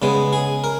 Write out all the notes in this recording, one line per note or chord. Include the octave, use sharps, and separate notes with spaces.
C#3 G#3 B3
G#4
A#4